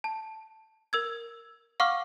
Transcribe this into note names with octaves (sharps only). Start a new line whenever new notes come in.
A5
A#4 E6 G#6
F5 F#5 C#6 D6 F6